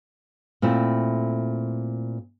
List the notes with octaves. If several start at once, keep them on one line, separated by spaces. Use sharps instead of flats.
A#2 A3 C4 E4